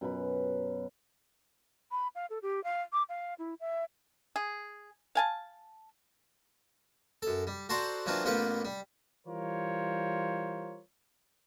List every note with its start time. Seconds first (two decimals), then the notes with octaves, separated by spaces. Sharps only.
0.01 F#2 B2 B5
1.91 B5
2.15 F5
2.30 A4
2.42 G4
2.64 F5
2.93 D6
3.09 F5
3.39 E4
3.60 E5
4.36 G#4
5.15 F5 G#5 A5
7.22 F#2 A4
7.47 G3
7.69 F#4 A4 C5 D5 F#5 A#5
8.06 E3 F#3 A#3 C4 D4 F4
8.25 A1 A#3 B3 F4 G4 B4
8.65 G3
9.26 E3 G3 F4 A#4 C5 C#5